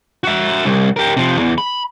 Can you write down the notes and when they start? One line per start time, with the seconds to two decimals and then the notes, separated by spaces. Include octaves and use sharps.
0.24 F#4 E5
0.65 C2
0.96 G4 A#4
1.17 C3 F3
1.36 E2
1.58 B5